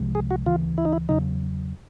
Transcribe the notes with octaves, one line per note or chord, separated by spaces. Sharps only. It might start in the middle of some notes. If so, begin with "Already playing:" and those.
Already playing: C2 C3 F3 G#3
G#4
F#4
D2 C#3 E3 F4
E4
D#4
E4
E2 C#3 F#3 D#4